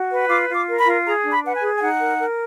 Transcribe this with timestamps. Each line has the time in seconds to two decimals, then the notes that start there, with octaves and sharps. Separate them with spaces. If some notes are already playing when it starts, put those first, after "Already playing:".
Already playing: F#4
0.11 B4
0.29 F4 D6
0.48 F4
0.54 D6
0.67 A#4
0.80 B5
0.86 F4
1.05 G#4 A#5
1.24 D4
1.30 B5
1.43 B4 F#5
1.55 G#5
1.62 G#4
1.76 G#5
1.81 D#4 F#5
2.00 A#4
2.18 A#4